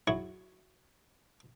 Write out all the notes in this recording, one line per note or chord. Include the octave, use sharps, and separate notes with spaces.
F#3 E4 G#4 C#5 C#6